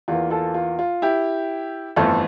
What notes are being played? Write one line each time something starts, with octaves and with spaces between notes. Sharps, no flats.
E2 E3 A#3 F4
F4 A4
F4
F4
E4 G4
G1 F2 E3 A3 F4 A4